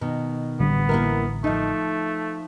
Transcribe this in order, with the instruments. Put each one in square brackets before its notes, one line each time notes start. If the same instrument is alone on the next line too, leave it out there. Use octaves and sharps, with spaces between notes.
[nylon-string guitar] B2 D#3
[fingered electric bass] A1 D3 G3 [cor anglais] B3
[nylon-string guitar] A#3 E4 A#4
[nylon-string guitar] F3 D#4 [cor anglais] A3